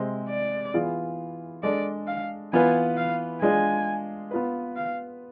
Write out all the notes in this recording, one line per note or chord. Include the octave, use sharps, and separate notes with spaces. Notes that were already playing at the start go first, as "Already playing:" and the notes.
Already playing: C3 G#3 C4
D5
E3 B3 F4 G#4
G#3 D4 A4 D5
F5
E3 B3 F4 B4 G#5
F5
G#3 D4 F4 G#4 G#5
B3 F4 B4
F5